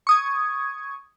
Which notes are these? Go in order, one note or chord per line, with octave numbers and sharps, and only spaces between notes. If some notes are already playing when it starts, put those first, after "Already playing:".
C#6 D#6 G#6